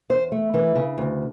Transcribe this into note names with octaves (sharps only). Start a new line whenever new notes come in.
E2 C5
A3
E3 B4
C#3
D2